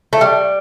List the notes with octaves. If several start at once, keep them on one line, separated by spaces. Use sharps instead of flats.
A3
G3